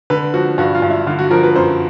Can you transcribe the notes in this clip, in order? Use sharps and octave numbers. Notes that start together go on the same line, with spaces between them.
D3 B4
F3 F#4
G2 F#4
F4
G2
E4
D3 F4
F#4
F3 A#4
B4
F#2 C5